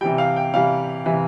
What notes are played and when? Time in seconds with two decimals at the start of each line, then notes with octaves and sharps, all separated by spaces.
0.01 C3 E3 G3 G5
0.18 F5
0.36 G5
0.54 C3 E3 G3 F5
1.06 C3 E3 G3